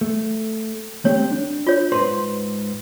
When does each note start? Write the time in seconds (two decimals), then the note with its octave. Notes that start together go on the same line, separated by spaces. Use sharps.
0.01 A3
1.05 A3 C4 G4 C#5
1.32 D4
1.67 F4 C#5
1.92 G#2 B4 C5 C6